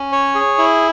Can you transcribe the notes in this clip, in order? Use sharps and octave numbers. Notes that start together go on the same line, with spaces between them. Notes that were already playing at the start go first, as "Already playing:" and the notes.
Already playing: C#4
C#5
G#4
E4